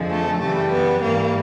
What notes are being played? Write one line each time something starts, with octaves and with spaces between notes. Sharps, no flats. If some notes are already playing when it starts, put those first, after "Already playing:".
Already playing: F2 D3 F3 G#3
A3
F#2 C#3 E3 G3 A3
B3
G#2 E3 G3 A#3